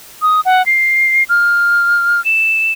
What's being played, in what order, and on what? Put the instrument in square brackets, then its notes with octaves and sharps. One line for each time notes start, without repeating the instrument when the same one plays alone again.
[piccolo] D#6
F#5
C7
F6
E7